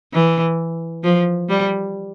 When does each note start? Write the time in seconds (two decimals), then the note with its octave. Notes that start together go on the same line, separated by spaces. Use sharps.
0.13 E3
1.04 F3
1.49 G3